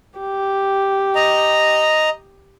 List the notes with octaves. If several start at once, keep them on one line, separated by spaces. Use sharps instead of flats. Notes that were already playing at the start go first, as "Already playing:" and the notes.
G4
D#5 A#5